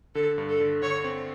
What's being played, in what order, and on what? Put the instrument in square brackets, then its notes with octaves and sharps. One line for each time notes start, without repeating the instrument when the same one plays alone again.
[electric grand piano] D3 [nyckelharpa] A4
[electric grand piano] G2
[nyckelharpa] A4
[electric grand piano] D3
[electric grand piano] D3 [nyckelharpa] C#5
[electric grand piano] C4